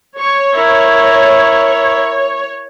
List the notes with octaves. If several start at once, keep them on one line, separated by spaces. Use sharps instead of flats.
C#5 C#6
E4 A#4